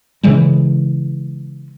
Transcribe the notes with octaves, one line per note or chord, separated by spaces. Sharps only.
C#3 E3 G#3